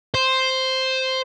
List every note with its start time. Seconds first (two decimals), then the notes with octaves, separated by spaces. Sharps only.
0.14 C5